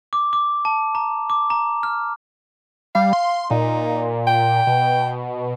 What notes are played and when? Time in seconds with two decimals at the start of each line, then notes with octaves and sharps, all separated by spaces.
0.13 D6
0.33 D6
0.65 A5
0.95 A#5
1.30 D6
1.50 A#5
1.83 F6
2.95 G3 F5
3.13 C6
3.50 A#2 D#4
4.27 G5
4.67 B2